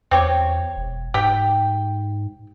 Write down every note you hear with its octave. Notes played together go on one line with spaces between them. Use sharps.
E2 C4 G4 C#5
E1
G#2 G4 G5